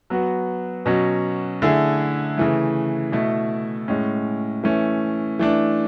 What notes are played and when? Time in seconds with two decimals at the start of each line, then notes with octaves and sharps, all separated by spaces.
0.10 F#3 B3 F#4
0.86 B2 F#3 C#4
1.62 D3 A3 E4 G#4
2.38 C#3 E3 A3
3.12 B2 A3 E4
3.88 A2 G#3 C#4
4.64 E3 A3 C#4
5.39 E3 A3 D4